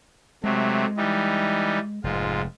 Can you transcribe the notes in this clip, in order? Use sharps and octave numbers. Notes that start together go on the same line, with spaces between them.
C3 F#3 G#3 A3
E3 G3 D#4
F1 G#2 F4